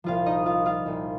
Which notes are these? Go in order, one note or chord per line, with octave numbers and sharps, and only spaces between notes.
C2 A#2 F3 F4 F5
D#4 D#5
F4 F5
F4 F5
C2 A#2 F3